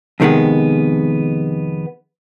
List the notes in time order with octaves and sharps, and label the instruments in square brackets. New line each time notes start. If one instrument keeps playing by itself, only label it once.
[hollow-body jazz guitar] F2 C3 D#3 G#3 B3